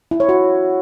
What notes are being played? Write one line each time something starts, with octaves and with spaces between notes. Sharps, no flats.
E4
C#5
F#4